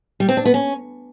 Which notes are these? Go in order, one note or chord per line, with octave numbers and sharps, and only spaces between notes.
G3
C4
D4
B3
C#4